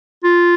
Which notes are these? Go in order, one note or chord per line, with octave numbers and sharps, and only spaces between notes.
F4